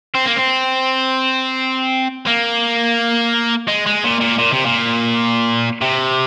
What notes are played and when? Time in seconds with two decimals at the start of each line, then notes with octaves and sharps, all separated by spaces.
0.15 C4
0.26 A#3
0.37 C4
2.26 A#3
3.68 G#3
3.87 G#3
4.04 A#2
4.21 A#2
4.39 A#2
4.53 C3
4.66 A#2
5.81 C3